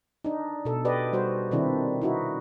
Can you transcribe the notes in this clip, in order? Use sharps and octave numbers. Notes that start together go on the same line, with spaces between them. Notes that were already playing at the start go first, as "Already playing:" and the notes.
D4 D#4
B2 A4
G4 B4 D5 D#5
G3 F#4 C5
C3 D#3 C4 D4 E4
D#4 E4 F#4